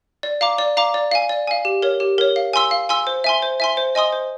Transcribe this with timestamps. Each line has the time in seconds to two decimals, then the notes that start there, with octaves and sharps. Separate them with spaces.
0.23 D5
0.41 F5 A#5 D6
0.58 D5
0.77 F5 A#5 D6
0.94 D5
1.11 F5 G#5
1.29 D5
1.47 F5 G#5
1.65 G4
1.82 A#4 C#5
2.00 G4
2.18 A#4 C#5
2.36 F5
2.53 G#5 C6 E6
2.71 F5
2.89 G#5 C6 E6
3.07 C5
3.24 E5 G#5 C6
3.42 C5
3.60 E5 G#5 C6
3.77 C5
3.95 D#5 G#5 C6 D#6
4.12 C5